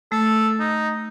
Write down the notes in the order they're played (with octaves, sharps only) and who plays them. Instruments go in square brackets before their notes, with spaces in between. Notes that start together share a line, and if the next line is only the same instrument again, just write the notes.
[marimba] A3 [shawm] A4
[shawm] D#4